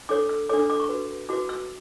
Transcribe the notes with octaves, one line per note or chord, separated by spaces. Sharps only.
D4 A4 C#5 D6
E6
D4 A4 C#5 D6
E6
D6
C#6
F#4 B4
F#4 B4 D6
E6